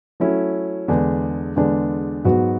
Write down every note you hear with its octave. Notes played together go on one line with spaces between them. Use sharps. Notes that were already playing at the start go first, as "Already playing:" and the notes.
F#3 A3 C#4 E4
E2 D3 G#3 D4
E2 D3 G#3 D4
G#2 F#3 B3 F#4